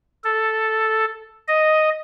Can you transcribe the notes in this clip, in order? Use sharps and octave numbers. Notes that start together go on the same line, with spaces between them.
A4
D#5